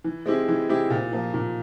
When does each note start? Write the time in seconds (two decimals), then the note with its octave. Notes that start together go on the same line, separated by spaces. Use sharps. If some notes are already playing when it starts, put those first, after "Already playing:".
0.04 E3
0.26 G#3 C4 E4 G4
0.48 E3
0.69 G#3 C4 E4 G4
0.90 A#2
1.12 F3 A#3
1.34 A#2